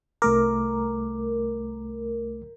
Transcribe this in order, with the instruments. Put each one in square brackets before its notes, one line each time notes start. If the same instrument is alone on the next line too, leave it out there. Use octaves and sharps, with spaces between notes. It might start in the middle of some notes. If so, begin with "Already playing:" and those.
[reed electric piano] C2 A3 D6 [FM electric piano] A#4